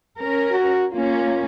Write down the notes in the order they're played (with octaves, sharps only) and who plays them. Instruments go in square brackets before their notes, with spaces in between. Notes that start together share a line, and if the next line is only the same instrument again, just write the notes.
[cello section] C#4 A#4
[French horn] F#4
[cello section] A#3 C#4 [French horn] F4